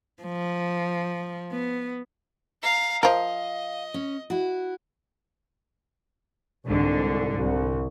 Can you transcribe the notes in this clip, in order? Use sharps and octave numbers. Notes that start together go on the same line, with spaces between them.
F3
B3
F5 A#5
F3 A#4 D#5 F5
C#4
E4 F#4
C2 G#2 D3
C2